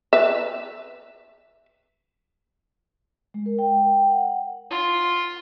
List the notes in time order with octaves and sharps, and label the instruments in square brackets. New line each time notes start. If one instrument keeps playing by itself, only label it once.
[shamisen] B4 E5
[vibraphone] G#3
A#4
G5
G5
F#5
[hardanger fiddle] F4